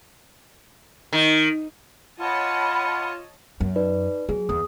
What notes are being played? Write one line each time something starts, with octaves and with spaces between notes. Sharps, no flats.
D#3
F4 C#5 D#5 F#5 A5 B5
F#2
D#4 B4 D5
F#3 G#4
E2 D#6